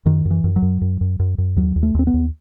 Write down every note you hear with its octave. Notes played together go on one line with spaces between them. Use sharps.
F#2 D#3
F#2
E3
F#2
F#3
F#2
F#2
F#2
F#2
F#2
D#2 F#3
D#2
A3
D#2 C4
B3
D#2